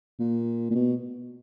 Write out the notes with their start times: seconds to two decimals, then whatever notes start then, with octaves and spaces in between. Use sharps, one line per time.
0.19 A#2
0.71 A#2
0.75 B2